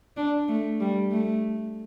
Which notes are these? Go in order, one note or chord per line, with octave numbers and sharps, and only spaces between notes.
D4
A3
G3
A3